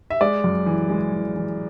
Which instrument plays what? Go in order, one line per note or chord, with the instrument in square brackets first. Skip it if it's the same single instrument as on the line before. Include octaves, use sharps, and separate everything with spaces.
[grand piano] E5
G#3 D5
F#2
E3
G#3
E3
E3